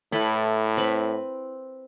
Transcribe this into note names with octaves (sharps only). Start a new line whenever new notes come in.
A2 E4 A4 B4
C4 B4